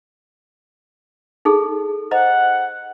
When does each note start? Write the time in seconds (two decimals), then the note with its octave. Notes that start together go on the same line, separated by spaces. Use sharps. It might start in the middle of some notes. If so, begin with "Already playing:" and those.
1.45 D#4 G#4 A4
2.11 C5 D#5 F#5 A#5